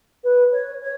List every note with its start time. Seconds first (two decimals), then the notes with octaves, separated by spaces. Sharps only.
0.23 B4
0.52 C#5
0.81 C#5